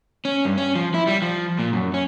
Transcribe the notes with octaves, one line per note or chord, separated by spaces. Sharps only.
C#4
G2
C#4
F3
E4
G3
F3
A#2
F#2
C#4